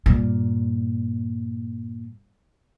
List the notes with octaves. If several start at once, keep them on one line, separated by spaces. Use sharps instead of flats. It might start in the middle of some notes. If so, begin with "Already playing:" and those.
G2 A#2